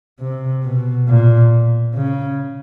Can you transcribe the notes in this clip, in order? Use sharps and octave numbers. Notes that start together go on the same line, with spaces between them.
C3
B2
A#2
C#3